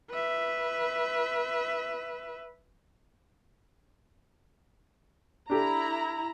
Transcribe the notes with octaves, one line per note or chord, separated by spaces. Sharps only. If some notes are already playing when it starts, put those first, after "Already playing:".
B4 E5
D4 E4 G4 A4 A#5